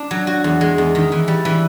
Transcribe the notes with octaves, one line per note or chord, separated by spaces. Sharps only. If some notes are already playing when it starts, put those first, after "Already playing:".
Already playing: D4
F#3
F#4
E2
G#3
E2
D#3
E3
G3
E3